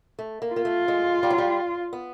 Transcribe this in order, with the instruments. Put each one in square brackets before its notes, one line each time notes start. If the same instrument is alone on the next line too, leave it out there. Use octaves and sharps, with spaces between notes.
[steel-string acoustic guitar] A3
A#3
[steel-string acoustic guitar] A#3 [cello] F4
[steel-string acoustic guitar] A3
G#3
G3
F#3
G3
B3